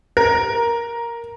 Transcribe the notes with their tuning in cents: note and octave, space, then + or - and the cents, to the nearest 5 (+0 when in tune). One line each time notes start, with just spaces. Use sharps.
A#4 +5